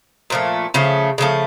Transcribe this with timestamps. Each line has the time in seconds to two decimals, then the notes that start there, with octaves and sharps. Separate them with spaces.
0.30 A#2 F3 A3
0.74 C#3 F3 A3
1.18 C#3 F3 A3